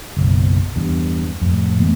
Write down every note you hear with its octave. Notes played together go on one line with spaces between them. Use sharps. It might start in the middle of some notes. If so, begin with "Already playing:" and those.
F#1 B1
E2 G2
F2 A2
E3 A3 B3